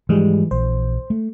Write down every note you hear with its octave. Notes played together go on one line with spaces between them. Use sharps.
G#2 E3 F3 G3 G#3
A#1 E3 C5
A3